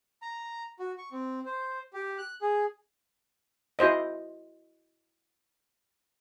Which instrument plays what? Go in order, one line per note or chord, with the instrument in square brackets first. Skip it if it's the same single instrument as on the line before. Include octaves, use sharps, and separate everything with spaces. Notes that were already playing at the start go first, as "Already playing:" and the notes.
[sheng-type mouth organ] A#5
F#4
C#6
C4
C5
G4
F#6
G#4
[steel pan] E4 F#4 C5 D#5